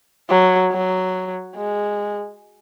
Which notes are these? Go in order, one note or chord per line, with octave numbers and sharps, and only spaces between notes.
F#3
F#3
G#3